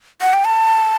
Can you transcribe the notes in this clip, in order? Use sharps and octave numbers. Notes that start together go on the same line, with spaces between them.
F#5
G5
A5